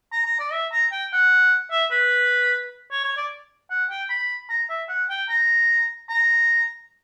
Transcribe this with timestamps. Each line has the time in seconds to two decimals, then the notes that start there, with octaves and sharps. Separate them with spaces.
0.12 A#5
0.26 A#5
0.40 D5
0.52 E5
0.72 A#5
0.92 G5
1.13 F#5
1.71 E5
1.91 B4
2.91 C#5
3.04 C#5
3.17 D5
3.70 F#5
3.90 G5
4.10 B5
4.49 A#5
4.69 E5
4.89 F#5
5.10 G5
5.29 A#5
6.09 A#5